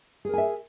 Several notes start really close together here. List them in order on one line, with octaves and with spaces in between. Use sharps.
G#4 A#4 G#5 E5